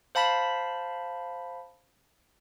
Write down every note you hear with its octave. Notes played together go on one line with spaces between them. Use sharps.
C5 F5 A5 B5 B6